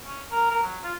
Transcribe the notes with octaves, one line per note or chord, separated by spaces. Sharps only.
C#4
A#4
A#4
F#3
F4